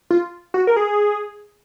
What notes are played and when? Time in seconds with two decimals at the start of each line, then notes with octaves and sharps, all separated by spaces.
0.10 F4
0.54 F#4
0.67 A#4
0.76 G#4